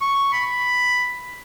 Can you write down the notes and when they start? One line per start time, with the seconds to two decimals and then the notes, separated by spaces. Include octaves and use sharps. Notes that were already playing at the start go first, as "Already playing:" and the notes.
0.01 C#6
0.33 B5